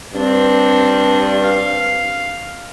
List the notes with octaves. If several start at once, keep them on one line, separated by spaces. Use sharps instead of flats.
G2 C4 D4
F5